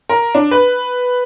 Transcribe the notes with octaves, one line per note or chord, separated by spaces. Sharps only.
A#4
D4
B4